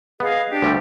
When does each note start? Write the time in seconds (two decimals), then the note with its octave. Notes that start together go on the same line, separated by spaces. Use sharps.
0.20 B3 G#4 D#5 F5
0.50 D4 G4
0.62 D2 G3 A3